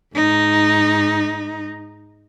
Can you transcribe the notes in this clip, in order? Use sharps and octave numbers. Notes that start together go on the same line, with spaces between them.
G#2 D#4